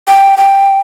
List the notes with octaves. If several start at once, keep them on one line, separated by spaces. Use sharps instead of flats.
G5
G5